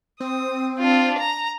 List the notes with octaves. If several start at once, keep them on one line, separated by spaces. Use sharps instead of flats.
C4 D#6
D4 F4
A#5